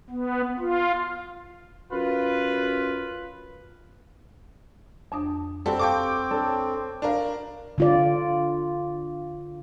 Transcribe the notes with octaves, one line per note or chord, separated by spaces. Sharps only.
B3
F4
F#2 F4 B4
F2 D4 G5 A5 D#6
G3 C4 F#4 A4
A4 F5 G5 A5 C#6 D6
D4 A4 C#5 A5
D4 F#4 A#4 B4 F5
D3 F4 D5